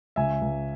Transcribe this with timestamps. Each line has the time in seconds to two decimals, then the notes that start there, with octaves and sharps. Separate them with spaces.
0.16 C#2 E5 G#5
0.41 C#2